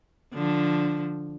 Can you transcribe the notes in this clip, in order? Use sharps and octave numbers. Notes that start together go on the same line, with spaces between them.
D3 F3